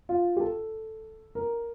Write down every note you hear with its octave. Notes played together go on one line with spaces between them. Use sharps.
F4
G4
A4
A#4